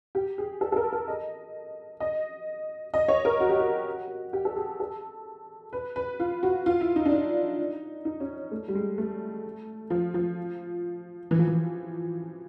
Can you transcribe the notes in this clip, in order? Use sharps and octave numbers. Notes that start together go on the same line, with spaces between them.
G4
G#4
A4
A4
A#4
A#4
D#5
D#5
D#5
C#5
A#4
F#4
G4
F#4
G4
A4
G#4
A4
B4
B4
F4
F#4
F4
E4
D#4
D4
D#4
D#4
C#4
A3
G3
G#3
A3
F3
F3
E3
F3
E3